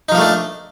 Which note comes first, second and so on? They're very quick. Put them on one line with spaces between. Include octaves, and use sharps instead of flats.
D#4 F3 A#3 A3 D4